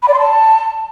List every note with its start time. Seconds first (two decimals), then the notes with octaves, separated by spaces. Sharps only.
0.02 B5
0.08 D5
0.13 C6
0.19 A5